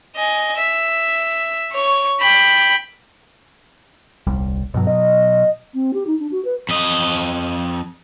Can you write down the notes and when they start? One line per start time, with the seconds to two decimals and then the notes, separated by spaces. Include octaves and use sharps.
0.16 D#5 G#5
0.57 E5
1.72 C#5 C#6
2.20 G5 B5
4.27 D#1 C2 G3
4.74 G2 B2 F#3
4.87 D#5
5.73 C4
5.94 G4
6.07 D#4
6.19 D4
6.32 F#4
6.45 B4
6.69 F2 D#5